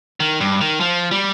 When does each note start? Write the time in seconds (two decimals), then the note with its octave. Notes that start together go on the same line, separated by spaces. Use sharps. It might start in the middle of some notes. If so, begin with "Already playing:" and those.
0.20 D#3
0.40 G2
0.61 D#3
0.80 F3
1.11 G3